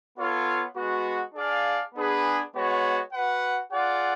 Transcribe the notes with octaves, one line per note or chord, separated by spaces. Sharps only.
B3 F4 A4 C#5 F5
G#3 B3 F#4
D4 G#4 D5 F5
B3 D4 G#4 B4
G#3 B3 F#4 C#5
F#4 B4 F#5
F4 G#4 D5 F#5